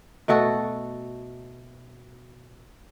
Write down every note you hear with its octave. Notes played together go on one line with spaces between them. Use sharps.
B2 A3 F#4 A4